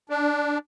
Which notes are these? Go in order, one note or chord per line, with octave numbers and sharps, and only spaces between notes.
D4